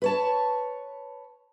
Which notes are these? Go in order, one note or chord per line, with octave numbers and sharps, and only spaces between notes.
B4 C#5 A5